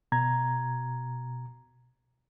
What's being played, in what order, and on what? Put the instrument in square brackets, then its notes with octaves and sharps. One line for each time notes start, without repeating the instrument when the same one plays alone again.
[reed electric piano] B2 A#5 G#6